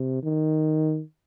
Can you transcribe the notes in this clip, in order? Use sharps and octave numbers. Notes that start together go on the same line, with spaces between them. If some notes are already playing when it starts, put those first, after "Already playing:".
Already playing: C3
D#3